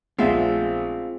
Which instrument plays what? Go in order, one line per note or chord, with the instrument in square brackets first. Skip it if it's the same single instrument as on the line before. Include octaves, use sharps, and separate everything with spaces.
[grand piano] A#1 E5 [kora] G#3 C4 [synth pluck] A3 B3 [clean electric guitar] F4